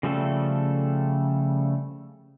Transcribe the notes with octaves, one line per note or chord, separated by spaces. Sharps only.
C#3 F3 G3 A3 A4